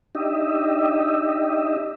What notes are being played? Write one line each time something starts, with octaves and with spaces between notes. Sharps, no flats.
D4 D#4 G4 D#5 E5